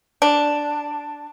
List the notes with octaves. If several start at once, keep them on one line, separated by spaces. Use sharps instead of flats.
D4